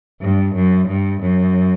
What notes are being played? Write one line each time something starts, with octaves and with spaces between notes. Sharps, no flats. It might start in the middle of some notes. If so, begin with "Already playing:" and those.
G2
F#2
G2
F#2